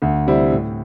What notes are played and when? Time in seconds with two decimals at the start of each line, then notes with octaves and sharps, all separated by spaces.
0.02 D2
0.27 C3 G3 C4 E4
0.52 A2